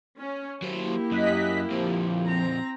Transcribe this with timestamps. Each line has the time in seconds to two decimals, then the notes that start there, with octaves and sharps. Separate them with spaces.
0.19 C#4
0.62 F#3 A#3 E4 G4 C5
1.12 F#2 D#5 F#6 B6
1.71 F2 A#2 F3
2.29 C4 A#5